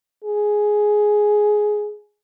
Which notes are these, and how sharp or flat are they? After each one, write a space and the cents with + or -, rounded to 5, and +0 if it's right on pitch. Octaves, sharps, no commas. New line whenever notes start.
G#4 +10